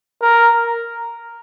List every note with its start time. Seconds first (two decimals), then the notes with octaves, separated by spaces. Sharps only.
0.22 A#4